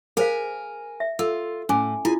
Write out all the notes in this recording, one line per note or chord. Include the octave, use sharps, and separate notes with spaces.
G#4 A#4 C5 F5 G#5
E5
F4 A4 E6
A2 C#4 G#5 D6
E4 F4 G#4